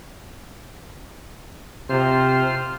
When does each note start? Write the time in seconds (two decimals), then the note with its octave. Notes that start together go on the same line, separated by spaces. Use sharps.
1.89 C3 F4 C5 F6